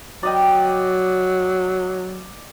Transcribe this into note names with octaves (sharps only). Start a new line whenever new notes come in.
F#3 D5 D#5 G5